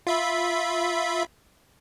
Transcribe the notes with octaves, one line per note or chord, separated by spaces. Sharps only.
F4 E5 B5